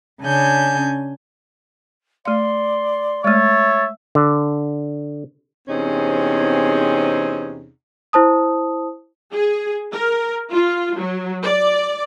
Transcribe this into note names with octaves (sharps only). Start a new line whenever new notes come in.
C#3 C#4 D4 G#5 G6
A3 D5 F5 C6
G#3 A3 C#5 E5 A6
D3
E2 C3 C4 C#4 D#4 G#4
E4 C5 A5 D#6
G#4
A#4
F4
F#3
D5